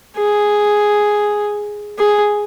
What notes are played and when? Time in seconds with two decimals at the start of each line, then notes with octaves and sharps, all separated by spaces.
0.17 G#4
1.99 G#4